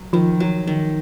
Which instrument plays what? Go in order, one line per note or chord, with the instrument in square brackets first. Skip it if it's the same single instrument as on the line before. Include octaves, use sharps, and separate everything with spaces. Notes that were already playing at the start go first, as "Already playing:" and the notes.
Already playing: [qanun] F#3
[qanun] D#3 [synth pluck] F3
[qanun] F#3
D#3